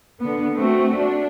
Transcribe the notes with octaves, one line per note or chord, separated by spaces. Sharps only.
D3 B3
A3 C4 F#4
D4